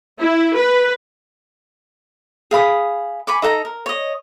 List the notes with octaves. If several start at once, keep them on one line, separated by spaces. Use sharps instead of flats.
E4
B4
G#4 F5 B5 D#6
G#5 B5 C#6 D6
D#4 A4 F#5 A#5
A#4
C#5 D#5